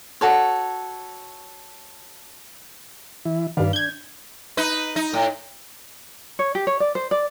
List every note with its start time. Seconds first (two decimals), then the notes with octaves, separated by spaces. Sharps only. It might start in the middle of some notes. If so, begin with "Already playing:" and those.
0.21 F#4 A4 C#5
3.25 E3 E4
3.57 G2 D#3 B4 D5 F5
3.73 D4 G6 G#6
4.57 D#4 B4
4.96 D#4
5.14 A2
6.39 C#5
6.55 G4
6.67 C#5
6.80 D5
6.95 C5
7.11 D5